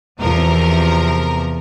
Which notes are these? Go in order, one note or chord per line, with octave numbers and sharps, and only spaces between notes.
E2 C3 F3 A#4